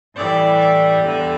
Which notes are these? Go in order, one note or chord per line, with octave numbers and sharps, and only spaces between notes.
A2 E3 G3 D5
D5
E2 D3 G3